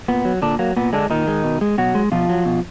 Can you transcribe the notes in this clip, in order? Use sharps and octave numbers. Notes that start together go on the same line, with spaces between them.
A#2 B3
F#3
A#2 D3 D4
F#3 A#3
A#2 B3
D3 G#3 D4
A#2 D#3 D#4
G#3
B2
G#3
B2 F#3 F#4
G#3
B2 F3 F4
F#3
B2